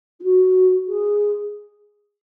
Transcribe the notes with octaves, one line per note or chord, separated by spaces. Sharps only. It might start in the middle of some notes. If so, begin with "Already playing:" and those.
E4
F#4
G#4